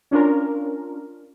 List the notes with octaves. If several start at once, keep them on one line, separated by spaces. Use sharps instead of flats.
C#4 D4 F4 A#4